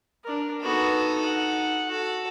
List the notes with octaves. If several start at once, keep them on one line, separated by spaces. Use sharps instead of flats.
D4 A#4
B3 D#4 F#4 A4
F#5
F#4 A4